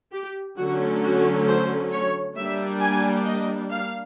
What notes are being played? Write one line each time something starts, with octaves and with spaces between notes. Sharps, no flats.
G4
D3 F#3 A3 C#4 F#4
F#4
C5
C#5
G3 A#3 D4 E5
G#5
D#5
F5